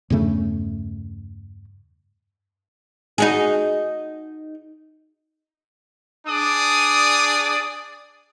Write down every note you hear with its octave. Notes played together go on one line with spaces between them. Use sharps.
E2 G2 C#3 A3
D#4 F#4 G#4
D4 G#4 D5 D#6